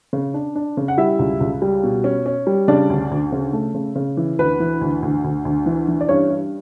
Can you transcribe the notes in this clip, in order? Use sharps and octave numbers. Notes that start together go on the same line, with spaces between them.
C#3
D4
D4
C#3
F#5
G3 E4 E5
C#2
C#2
G3
B2
C#4
C#4
G3
C#3 D4 D5
D2
D2
C#3
A3
C#3
C#3
E3
D2 B4
E3
D2
D2
D2
D2
E3
E3
D5
G2 C#4 C#5
G2